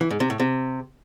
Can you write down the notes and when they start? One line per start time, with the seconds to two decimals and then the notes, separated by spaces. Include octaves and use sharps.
0.01 E3
0.10 G#2
0.20 C3
0.30 A2
0.40 C3